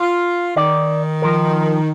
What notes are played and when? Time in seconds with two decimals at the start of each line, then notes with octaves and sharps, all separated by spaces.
0.01 F4
0.56 D#3 D5
1.22 F3 A#4